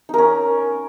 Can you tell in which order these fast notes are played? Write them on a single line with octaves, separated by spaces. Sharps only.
D#4 A#4 C#4